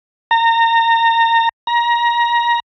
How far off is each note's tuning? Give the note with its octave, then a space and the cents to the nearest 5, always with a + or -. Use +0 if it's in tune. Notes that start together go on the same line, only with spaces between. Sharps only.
A#5 -25
A#5 +25